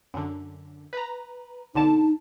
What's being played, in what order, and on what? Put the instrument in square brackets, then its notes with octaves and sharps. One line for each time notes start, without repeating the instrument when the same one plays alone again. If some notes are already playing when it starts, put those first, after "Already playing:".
[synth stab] F#2 D3
B4 A#5
[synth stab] B1 D3 A5 [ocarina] D#4